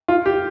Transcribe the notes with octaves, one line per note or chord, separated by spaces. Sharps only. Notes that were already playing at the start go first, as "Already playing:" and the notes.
F4
G4